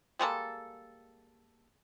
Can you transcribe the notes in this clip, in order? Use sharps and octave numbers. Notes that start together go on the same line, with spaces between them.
G3 G#3 A#3 A4